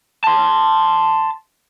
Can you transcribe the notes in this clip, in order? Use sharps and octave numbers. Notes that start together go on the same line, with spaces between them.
A5 C6